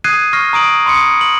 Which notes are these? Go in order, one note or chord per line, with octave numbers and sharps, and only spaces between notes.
D#6 F#6 G#6 C7 D#7
C#6 F6 A#6 C7
A#5 D#6 D7 F#7
B5 C6 D#6 C#7
F#7